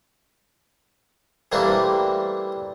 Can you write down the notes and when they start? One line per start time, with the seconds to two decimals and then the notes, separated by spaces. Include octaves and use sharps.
1.52 E3 G3 A3 A#3 C4 D4